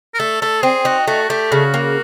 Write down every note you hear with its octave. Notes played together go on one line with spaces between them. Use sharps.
A#4
A3 A4
A3 A4
C4 G#4
D#4 F#4
A3 F#4
A3 G4
C#3 F#4
A#3